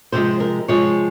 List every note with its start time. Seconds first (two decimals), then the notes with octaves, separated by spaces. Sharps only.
0.12 C3 F3 G#3 C5
0.40 A#4
0.68 C3 F3 G#3 C#5